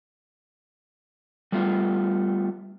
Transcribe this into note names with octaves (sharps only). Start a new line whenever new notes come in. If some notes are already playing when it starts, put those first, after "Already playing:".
G3 A3 B3 F4